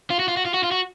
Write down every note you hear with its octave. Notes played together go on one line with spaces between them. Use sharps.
F4
F#4
F4
F#4
F4
F#4
F4
F#4